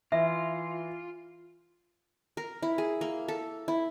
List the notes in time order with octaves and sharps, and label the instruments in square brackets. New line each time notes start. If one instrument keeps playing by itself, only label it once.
[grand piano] E3 [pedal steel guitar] F4 [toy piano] E5
[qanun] A#4
E4
G#4
A#3
A4
E4